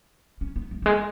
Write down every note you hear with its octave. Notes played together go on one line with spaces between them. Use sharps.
C#4
B3
A3
F#3
G#3